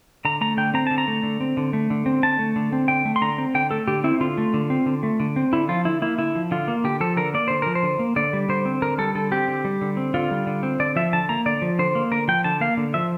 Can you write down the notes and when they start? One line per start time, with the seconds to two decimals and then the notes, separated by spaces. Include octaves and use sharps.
0.25 D3 A#5
0.41 A3 A#5
0.57 D3 G5
0.74 C4 A#5
0.87 D3 A5
0.98 A#5
1.08 A3
1.23 D3
1.40 C4
1.57 D3
1.73 A3
1.90 D3
2.06 C4
2.23 D3 A5
2.39 A3
2.56 D3
2.72 C4
2.88 D3 G5
3.05 A3
3.16 C6
3.21 D3 A#5
3.38 C4
3.55 D3 G5
3.71 A3 A4
3.87 D3 G4
4.04 C4 E4
4.21 D3 F4
4.38 A3
4.54 D3
4.70 C4
4.86 D3
5.03 A3
5.20 D3
5.36 C4
5.53 D3 E4
5.69 F3 F4
5.85 D3 E4
6.02 A#3 E4
6.18 D3 E4
6.35 F3
6.51 D3 F4
6.68 A#3
6.84 D3 G4
7.00 F3 A4
7.17 D3 A#4
7.34 A#3 D5
7.48 D3 C5
7.62 F3 A#4
7.75 C5
7.83 D3
7.99 A#3
8.16 D3 D5
8.33 G3
8.49 D3 C5
8.65 C4
8.82 D3 A#4
8.98 G3 A4
9.15 D3 A4
9.31 C4 G4
9.48 D3
9.65 G3
9.82 D3
9.97 C4
10.14 D3 F4
10.31 G3
10.47 D3
10.63 C4
10.80 D3 D5
10.96 F3 E5
11.13 D3 A5
11.29 A#3 A#5
11.46 D3 D5
11.62 F3
11.79 D3 C5
11.95 A#3
12.11 D3 A#4
12.28 F3 G5
12.44 D3 A5
12.61 A#3 F5
12.77 D3
12.94 F3 E5